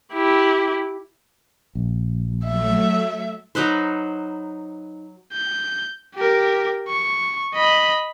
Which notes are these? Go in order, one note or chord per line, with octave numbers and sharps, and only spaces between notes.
E4 G4
A#1
F#3 A3 E5
F#3 D#4 B4 C5
G6
G4 A#4
C#6
D#5 B5